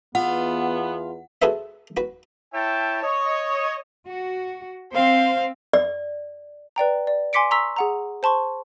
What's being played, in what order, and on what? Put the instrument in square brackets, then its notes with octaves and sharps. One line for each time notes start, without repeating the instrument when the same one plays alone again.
[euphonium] E2 [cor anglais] B3 [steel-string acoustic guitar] F4 [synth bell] F#5
[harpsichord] F#4 G#4 A4 B4 C5 E5
F#4 B4
[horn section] E4 C#5 E5 G5 A5
C#5 D#5
[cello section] F#4
[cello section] C4 [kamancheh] C5 F5
[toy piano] D5
[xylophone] B4 D5 G5 A#5
D5
G#5 C6 D6 B6 C#7 D7
A#5 C6 C#6 E6 B6
G#4 F#5 A#5
C5 A5 C6 C#6